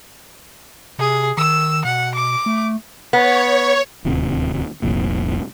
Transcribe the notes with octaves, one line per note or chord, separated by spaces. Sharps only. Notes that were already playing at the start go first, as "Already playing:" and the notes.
C3 G#4
D#3 E6
B2 F#5
D6
A3
B3 C#5
D1 D#2 C3
F1 C2 F2 A#2